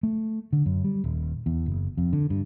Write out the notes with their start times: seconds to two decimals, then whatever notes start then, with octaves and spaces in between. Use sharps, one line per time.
0.03 A3
0.53 D3
0.66 F#2
0.84 G3
1.04 D#1
1.46 E2
1.66 F#1
1.97 F2
2.13 D3
2.30 G2